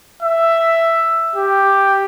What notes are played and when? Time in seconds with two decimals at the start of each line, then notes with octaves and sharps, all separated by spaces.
0.23 E5
1.36 G4